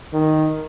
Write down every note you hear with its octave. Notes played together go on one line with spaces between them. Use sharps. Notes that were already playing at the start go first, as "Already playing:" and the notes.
D#3